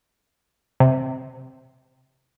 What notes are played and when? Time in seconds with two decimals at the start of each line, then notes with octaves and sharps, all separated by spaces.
0.80 C3